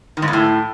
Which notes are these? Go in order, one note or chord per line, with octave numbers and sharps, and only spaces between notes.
D#3
G#2
E2
A2